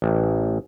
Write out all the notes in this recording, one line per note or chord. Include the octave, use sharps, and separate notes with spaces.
A1